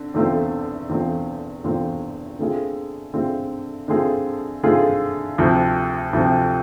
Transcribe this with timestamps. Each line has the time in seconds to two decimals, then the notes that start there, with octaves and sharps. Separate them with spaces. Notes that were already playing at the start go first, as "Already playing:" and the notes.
Already playing: D3 C4
0.14 E2 D3 A3 C4 F4
0.89 E2 D3 A3 C4 F4
1.64 E2 D3 A3 C4 F4
2.39 D3 A3 C4 F4 G#4
3.13 D3 A3 C4 F4 G#4
3.88 D3 A3 C4 F4 G#4
4.63 D3 A3 C4 F4 G#4
5.38 D2 C3 F3
6.13 D2 C3 F3